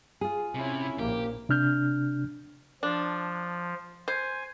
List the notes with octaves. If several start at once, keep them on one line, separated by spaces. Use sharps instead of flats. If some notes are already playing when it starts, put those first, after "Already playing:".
F4 G#4
C3 C#4 E4
A#1 A#3 G4
C3 D4 F6 G6
F3 D4
C5 G#5